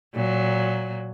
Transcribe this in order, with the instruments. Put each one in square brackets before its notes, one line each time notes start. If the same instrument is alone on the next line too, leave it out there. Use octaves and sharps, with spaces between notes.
[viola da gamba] A#2 F#3